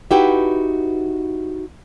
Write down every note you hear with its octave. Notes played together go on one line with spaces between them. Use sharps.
D#4 E4 F#4 G4 B4 E5